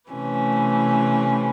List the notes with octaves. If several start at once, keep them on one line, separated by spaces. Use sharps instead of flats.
C3 E3 A3 C#4